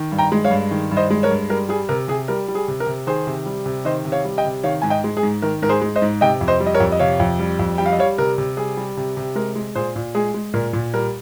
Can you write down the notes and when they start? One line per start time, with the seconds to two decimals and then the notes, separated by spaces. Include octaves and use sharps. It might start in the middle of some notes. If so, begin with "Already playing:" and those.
Already playing: D#3
0.12 G2
0.18 G5 A#5
0.32 G#3
0.45 C#5 F5
0.51 G2
0.71 D#3
0.91 G2
0.97 C5 D#5
1.10 G#3
1.23 A#4 C#5
1.30 G2
1.50 G3 A#4
1.69 G3 G#4
1.89 C3 A#4
2.08 C3 G#4
2.28 G3 A#4
2.48 G3
2.55 G#4
2.68 C3
2.80 A#4
2.87 C3
3.07 D#3 G#4 C5
3.27 C3
3.46 G3
3.66 C3
3.85 D#3 C5 D#5
4.05 C3
4.12 C#5 F5
4.25 G3
4.38 D#5 G5
4.45 C3
4.64 D#3 C#5 F5
4.82 G#2 G#5
4.90 D#5 G5
5.04 G#3
5.17 G#4
5.23 G#2
5.42 D#3 A#4
5.62 G#2 A#4
5.69 G#4 C5
5.82 G#3
5.96 C5 D#5
6.02 G#2
6.21 C3 D#5 G5
6.41 F2
6.48 C5 D#5
6.60 G3
6.66 D#5
6.74 A#4 C#5
6.80 F2
6.92 D#5
6.99 C3 C#5 F5
7.20 F2
7.39 G3
7.59 F2
7.78 G3 G5
7.86 F5
7.92 D#5
7.98 G3 C#5 F5
8.18 C3 A#4
8.38 C3
8.57 G3 G#4
8.77 G3
8.97 C3
9.17 C3
9.35 G#3 A#4
9.55 G#3
9.75 A#2 G#4 C5
9.96 A#2
10.15 G#3 G#4
10.34 G#3
10.54 A#2 A#4
10.73 A#2
10.94 G3 A#4